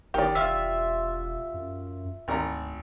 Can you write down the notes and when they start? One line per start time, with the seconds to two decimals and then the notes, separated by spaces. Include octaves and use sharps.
0.14 G1 D#3 G4 D5
0.35 E1 F4 E5
1.54 F#2
2.28 G#1 D2 A#5